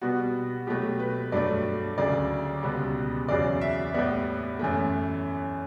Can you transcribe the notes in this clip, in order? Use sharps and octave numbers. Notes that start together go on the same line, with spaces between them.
B2 G3 B3 F#4
B2 F#3 A3 G4
B4
G2 F#3 A3 D5
D2 C#3 F#3 D5
C#2 B2 G3 B3
E2 C#3 F#3 D5
E5
A2 G3 B3 D5
F#2 E3 A3